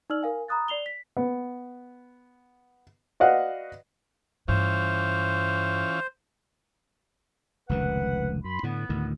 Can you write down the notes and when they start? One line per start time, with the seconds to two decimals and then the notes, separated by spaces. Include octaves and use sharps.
0.10 D#4 D5 E6 F6 F#7
0.23 A#4 F5 G#5
0.48 A#5 B5 D#6 F#6 A6
0.68 D5 C7 F7 G7
0.86 B6
1.17 B3
3.20 F#4 B4 D5 D#5 F5 F#5
4.48 G2 E3 C#4 F4 C5
7.69 F1 C#2 D#3 B4 F#5
8.44 F#2 B5 C6
8.63 A2 D3 B3
8.89 D2 A2 D#3